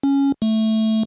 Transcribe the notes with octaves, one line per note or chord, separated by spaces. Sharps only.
C#4
A3